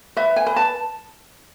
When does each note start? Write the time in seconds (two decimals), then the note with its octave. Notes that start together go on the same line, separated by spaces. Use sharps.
0.17 B4 E5
0.36 G#5
0.46 B4
0.56 A5